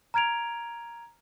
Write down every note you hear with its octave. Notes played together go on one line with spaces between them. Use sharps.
A#5 F6 G#6 D7 F7